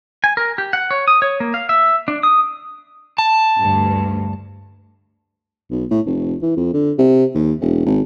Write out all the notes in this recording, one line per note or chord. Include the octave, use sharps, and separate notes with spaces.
G#5
A#4
G4
F#5
C#5
D#6
C#5
A#3
F5
E5
D4
D#6
A5
D2 G2
B1
A2
F1
E3
F2
D3
C3
D#2
E1
G#1